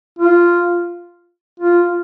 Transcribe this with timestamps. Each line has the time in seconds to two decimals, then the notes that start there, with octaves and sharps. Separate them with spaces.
0.19 F4
1.60 F4